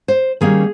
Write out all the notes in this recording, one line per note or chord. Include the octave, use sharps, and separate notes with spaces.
C5
D#3 G3 A#3 C#4 G#4